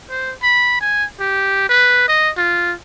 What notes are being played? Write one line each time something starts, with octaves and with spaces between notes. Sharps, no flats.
C5
B5
G#5
G4
B4
D#5
F4